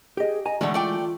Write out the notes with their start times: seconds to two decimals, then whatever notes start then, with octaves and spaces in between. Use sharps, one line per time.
0.17 G4 G#4 D#5
0.46 D#5 G#5 A#5
0.61 B2 D3 E3 G#3 A3 F#4 D5
0.74 A3 F4 D5 G5